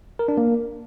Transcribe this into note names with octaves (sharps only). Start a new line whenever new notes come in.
A#4
D4
A#3